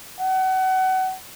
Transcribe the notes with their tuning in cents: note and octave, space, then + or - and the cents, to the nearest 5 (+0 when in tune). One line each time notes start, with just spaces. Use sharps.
F#5 +30